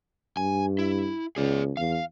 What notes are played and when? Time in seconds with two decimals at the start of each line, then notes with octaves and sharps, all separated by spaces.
0.37 G2 G#5
0.79 E4
1.36 C#2 G#4 D5
1.77 E2 F5